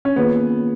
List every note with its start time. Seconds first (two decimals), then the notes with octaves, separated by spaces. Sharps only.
0.05 C#4
0.16 D#3 A#3 B3 F4 G#4 B4